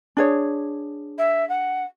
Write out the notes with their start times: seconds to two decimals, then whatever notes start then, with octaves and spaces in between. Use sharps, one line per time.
0.17 D4 G#4 C#5
1.18 E5
1.49 F#5